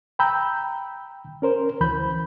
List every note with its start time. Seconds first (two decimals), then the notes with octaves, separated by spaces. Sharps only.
0.19 G5 A#5 B5 E6 G6
1.42 C#4 A#4 C5
1.81 D2 E3 B5 G6